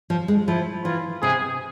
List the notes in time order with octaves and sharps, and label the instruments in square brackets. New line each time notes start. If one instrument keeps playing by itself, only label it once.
[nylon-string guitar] F3
G#3
[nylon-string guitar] F3 [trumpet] E4
[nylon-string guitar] E3 [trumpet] F4
[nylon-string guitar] C3 [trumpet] G#4